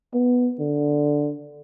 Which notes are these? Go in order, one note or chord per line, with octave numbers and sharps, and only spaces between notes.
B3
D3